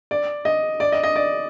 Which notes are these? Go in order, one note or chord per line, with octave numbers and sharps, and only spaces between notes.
D5
D#5
D5
D#5
D#5
D5